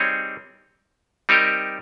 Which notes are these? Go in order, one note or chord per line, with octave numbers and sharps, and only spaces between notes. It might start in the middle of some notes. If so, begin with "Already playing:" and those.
Already playing: G3 C4 D#4 G#4 C#5
G3 C4 D#4 G4 A#4